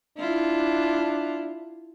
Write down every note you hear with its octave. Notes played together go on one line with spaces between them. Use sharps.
D4 E4 F4